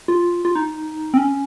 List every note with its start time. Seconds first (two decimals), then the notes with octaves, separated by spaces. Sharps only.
0.08 F4
0.45 F4
0.55 D#4
1.14 C4
1.17 C#4